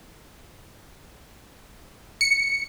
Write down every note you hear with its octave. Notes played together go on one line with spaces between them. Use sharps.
C#7